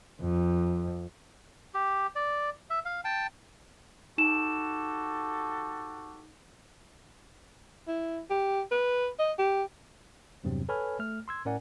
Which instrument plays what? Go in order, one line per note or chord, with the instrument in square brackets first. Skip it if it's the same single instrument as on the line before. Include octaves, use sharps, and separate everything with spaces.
[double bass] F2
[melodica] G4
D5
E5
F5
G5 A5
[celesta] D#4 E7 [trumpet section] F#4 G4 A4
[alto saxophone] E4
G4
B4
D#5
G4
[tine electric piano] E2 G2 C3 F#3 C4
A4 B4 C#5 G#5 B5 F6
A3 F6
C6 E6 G#6
A2 C#4 A#4 D5 F#5 G#5